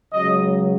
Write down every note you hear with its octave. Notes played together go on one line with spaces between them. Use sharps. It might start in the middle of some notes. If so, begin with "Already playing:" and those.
C#2 C#3 F#3 D#5